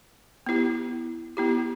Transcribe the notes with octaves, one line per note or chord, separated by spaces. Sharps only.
B3 E4 G4
B3 E4 G4